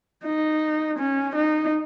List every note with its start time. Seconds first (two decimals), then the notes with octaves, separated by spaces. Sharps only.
0.25 D#4
0.98 C#4
1.35 D#4